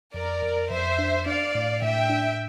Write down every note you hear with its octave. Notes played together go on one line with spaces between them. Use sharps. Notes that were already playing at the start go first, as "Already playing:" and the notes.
F2 A#4 D5
F2
F2 C5 E5
D4
D4 D5 F5
A2
A2 E5 G5
D4